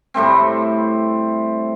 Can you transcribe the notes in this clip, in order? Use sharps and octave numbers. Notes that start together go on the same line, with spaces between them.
A2 G3 A3 C4